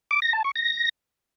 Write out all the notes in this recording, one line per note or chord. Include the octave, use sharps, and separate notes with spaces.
D6
A#6
A5
C#6
A#6